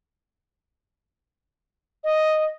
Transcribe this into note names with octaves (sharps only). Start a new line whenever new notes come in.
D#5